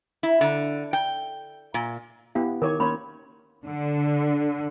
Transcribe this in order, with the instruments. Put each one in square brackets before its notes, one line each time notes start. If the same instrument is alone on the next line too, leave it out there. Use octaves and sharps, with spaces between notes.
[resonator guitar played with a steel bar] E4
D3
G5
A#2
[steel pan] B3 E4 G4 [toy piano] F5
[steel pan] D#3 C#5 [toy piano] A#4 D6
[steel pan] A#3 A#4 C#5 [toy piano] C#4 B5 C6
[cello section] D3